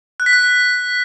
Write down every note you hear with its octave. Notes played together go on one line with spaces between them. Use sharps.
F#6
B6
F#6